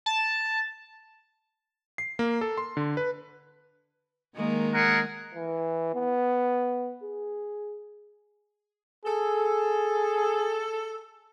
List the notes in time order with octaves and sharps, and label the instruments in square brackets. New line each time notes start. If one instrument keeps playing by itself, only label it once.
[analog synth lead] A5
[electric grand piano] C7
A#3
A4
C6
D3
B4
[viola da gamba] D#3 G#3 A#3
[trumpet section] G#4 A#4 F#5
[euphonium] E3
B3
G#4
[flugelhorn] G#4 [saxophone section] A4